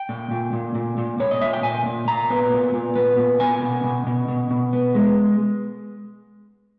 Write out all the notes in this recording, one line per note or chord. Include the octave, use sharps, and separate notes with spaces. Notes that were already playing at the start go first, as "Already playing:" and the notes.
Already playing: G5
A#2
A#2
A#2
A#2
A#2
A#2 C#5
D#5
A#2 E5
G5
A#2 G#5
A#2
A#2 A#5
B3
A#2
A#2
B3
A#2
B3 G#5
B2
B2
B2
B2
B2
B3
G#3